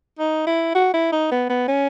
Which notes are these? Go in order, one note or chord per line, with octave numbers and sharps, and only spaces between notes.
D#4
E4
F#4
E4
D#4
B3
B3
C#4